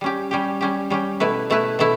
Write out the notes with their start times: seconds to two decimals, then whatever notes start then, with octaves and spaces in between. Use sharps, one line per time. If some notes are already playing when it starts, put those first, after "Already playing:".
0.01 G3 C#4 G4
0.31 G3 C#4 G4
0.61 G3 C#4 G4
0.90 G3 C#4 G4
1.20 B2 A3 E4 B4
1.50 B2 A3 E4 B4
1.79 B2 A3 E4